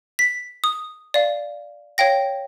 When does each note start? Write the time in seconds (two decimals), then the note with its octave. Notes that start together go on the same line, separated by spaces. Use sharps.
0.19 B6
0.64 D#6
1.14 D5 F5
1.98 C#5 F5 G5 A#6